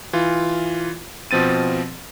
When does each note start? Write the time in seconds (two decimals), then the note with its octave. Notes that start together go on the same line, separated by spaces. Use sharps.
0.13 E3 F4
1.31 B2 F3 C4 A6 D#7